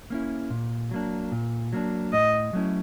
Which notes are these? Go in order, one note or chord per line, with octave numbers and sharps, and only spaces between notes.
A#3 C#4 E4
A#2
F#3 A#3 D4
A#2
F#3 A#3 D4
A2 D#5
F#3 A3 C#4 E4